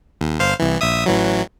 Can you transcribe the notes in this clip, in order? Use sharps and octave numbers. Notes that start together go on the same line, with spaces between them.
D#2
G1 C5 F5
C2 E3
A#1 E5 D#6
A1 E3 F#3